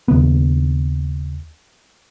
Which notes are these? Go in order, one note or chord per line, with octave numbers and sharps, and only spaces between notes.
D#2 C#3 A#3 B3